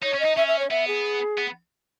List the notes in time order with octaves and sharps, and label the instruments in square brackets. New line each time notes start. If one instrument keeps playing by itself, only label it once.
[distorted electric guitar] D#4 [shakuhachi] C#5
[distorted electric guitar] C#4
[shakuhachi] D#5
[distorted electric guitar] D#4
[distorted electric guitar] C#4 [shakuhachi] E5
[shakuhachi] E5
C#5
[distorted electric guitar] B3 [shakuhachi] E5
[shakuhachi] G#4
[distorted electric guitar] B3